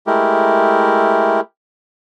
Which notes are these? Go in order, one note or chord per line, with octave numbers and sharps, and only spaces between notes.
G#3 A3 E4 G4 A#4